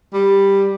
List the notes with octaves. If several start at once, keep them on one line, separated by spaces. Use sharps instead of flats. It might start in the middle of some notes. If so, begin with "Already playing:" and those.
G3